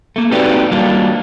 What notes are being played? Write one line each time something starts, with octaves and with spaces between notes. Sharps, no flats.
A3 A#3
C4 D#4 F#4 G4 B4 D5
F#3 G3 A#3 D4 F4